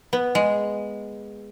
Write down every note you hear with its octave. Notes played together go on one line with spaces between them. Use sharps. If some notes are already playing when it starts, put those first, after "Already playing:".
B3
G#3